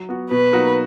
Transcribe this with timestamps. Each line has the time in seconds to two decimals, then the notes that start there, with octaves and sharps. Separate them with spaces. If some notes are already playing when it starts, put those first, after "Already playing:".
Already playing: F#3
0.09 B3 F#4
0.30 B2 B4
0.52 F#3 A#3 D#4 F#4